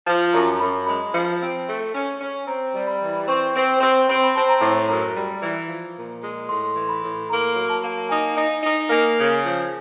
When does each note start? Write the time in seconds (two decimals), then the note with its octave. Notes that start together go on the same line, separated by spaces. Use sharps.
0.06 F3 A5
0.33 F#2 A#5
0.60 F#2 B5
0.86 G#3 B5
1.13 F3
1.41 C4
1.67 A3
1.94 C#4
2.21 C#4
2.47 C4 A#5
2.74 G3
2.87 B5
3.01 E3
3.27 C4 C#6
3.55 C4
3.68 C6
3.81 C4
4.08 C4 B5
4.15 C6
4.23 B5
4.35 C4 A5
4.49 A#5
4.61 A2
4.88 F#2 A#5
5.15 G3
5.42 E3
5.69 F3
5.96 A#2
6.22 G#3
6.49 A2 C6
6.76 E3
6.89 B5
7.03 A2
7.29 A#3 A#5
7.56 F#3
7.69 A5
7.83 A#3
8.09 D#4 G#5
8.36 D#4
8.63 D#4
8.90 A#3 G#5
9.17 C#3
9.31 G#5
9.44 F3